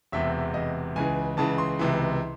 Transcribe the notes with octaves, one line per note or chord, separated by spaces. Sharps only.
E1 E2 C3 E5
E1 E2 C3 D#5
C#2 C#3 E3 G#5
C#2 C#3 E3 A5
C6
C#2 C3 E3